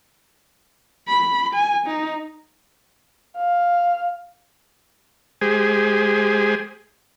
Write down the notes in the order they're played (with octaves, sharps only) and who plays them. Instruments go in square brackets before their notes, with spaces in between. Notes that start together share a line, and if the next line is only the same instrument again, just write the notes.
[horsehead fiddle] B5
G#5
D#4
[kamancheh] F5
[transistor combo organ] G#3 G4 G#4 C5 G#5